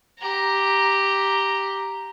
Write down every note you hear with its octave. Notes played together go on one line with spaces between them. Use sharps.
G4 A#5